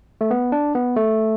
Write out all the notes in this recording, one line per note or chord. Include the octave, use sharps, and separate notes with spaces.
A3
B3
D4
B3
A3